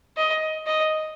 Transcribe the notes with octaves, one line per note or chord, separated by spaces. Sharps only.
D#5
D#5